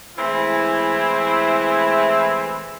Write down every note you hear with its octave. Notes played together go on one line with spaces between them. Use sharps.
E3 G#3 A3 C4 E4